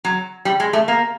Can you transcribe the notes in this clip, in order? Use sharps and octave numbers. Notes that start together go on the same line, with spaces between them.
F#3
G3
G#3
A3
A#3